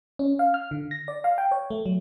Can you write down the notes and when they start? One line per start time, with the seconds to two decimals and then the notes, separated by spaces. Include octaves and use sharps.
0.19 C#4
0.39 F5
0.54 F6
0.71 D3
0.91 A#6
1.08 D5
1.24 F5
1.38 G5
1.51 C#5
1.70 A3
1.86 F#3